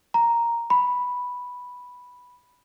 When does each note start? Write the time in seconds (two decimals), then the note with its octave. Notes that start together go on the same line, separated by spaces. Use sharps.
0.14 A#5
0.70 B5